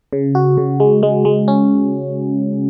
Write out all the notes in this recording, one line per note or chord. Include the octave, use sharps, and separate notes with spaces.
C#3
F#4
C#3
G#3
G#3
G#3
C#4